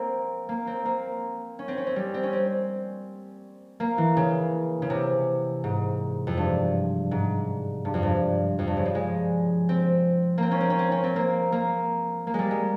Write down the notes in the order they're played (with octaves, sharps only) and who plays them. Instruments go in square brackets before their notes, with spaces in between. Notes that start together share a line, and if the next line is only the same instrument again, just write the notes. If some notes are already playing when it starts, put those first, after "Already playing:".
Already playing: [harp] A#3 C4
A#3
C4
A#3
C#4
C4
C#4
C4
G3
C4
C#4
C4
A#3
E3
C#3
C#3
C3
G#2
F2
G2
G#2
G2
F2
G2
F2
G2
C#3
F3
G#3
C4
A#3 C4
C#4
C4
C#4
C4
C#4
C4
A#3
A#3
A#3
G3 G#3
G#3